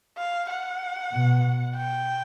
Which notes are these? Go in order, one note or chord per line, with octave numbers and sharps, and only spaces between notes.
F5
F#5
B2
G5